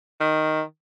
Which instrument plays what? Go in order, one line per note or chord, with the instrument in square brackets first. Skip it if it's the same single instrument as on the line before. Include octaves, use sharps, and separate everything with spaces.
[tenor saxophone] D#3